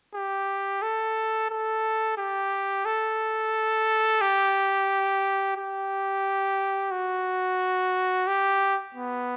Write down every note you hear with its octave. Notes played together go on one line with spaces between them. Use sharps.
G4
A4
A4
G4
A4
G4
G4
F#4
G4
B3